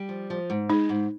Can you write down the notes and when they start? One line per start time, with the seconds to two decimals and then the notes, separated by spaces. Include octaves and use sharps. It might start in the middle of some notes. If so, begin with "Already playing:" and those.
Already playing: G3
0.09 F3
0.30 F3
0.50 G#2
0.70 G#3 D#4
0.89 G#2